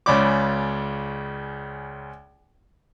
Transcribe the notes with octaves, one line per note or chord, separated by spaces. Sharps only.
C#2 C#3 C#5 D5 B5 D6